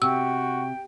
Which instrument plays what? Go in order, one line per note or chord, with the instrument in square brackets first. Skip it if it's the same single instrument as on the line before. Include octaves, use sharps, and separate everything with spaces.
[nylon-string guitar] C3 [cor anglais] F#4 [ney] G5 [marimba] E6